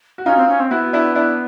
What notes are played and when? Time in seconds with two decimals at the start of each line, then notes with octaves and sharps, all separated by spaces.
0.18 F#4
0.25 C#4 D#4 F4
0.36 C4
0.48 C#4
0.59 C4
0.70 B3 E4 F#4
0.93 D4 E4
1.15 D4 E4